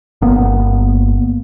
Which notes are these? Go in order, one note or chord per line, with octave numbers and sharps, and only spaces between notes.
G1 A#3 B3